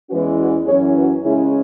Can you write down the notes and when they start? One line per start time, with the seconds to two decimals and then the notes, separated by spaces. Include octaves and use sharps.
0.09 E2 E3 G#3 C#4 F#4 B4
0.38 F#4 B4
0.67 F#2 E3 C#4 G#4 C#5
0.96 F#4 B4
1.24 C#3 G#3 C#4 E4 G#4